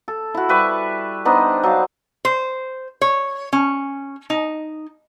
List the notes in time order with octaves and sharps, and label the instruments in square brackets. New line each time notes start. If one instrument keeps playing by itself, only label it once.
[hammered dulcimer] A4
E4 F#4
G3 B4 E5 C#6
B3 D4 D#4 C5
F#3 D4 F5
[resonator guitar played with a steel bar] C5
C#5
C#4
D#4